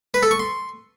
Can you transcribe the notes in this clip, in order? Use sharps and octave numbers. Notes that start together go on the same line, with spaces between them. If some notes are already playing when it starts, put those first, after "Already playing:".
B4
A4
C#6
C6